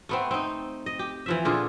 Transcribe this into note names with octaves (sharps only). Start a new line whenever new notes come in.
A3 B3 C4
C4 D#4
D#5
G4
E3 F3 E5
A#2 D3 F4 G#4